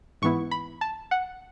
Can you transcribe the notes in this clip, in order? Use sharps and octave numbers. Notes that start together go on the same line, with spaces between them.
G#2 E3 B3 E4 C#6
B5
A5
F#5